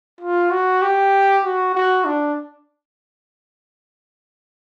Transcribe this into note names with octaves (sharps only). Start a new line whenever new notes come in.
F4
F#4
G4
F#4
F#4
D4